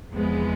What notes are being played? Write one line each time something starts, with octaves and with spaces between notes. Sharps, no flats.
E2 C3 F3 G#3 B3